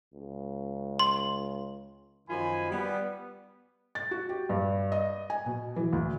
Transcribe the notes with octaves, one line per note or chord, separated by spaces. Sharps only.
C#2
C6
F#2 D#3 F3 F4 G#5 B5
G3 B3
A6
F#4
G4
G2
D#5
G#5
B2
E3
D2